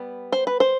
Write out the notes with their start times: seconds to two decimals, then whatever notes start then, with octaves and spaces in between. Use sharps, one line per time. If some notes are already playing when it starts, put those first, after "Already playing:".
Already playing: G3 B3
0.32 C5
0.47 B4
0.60 C5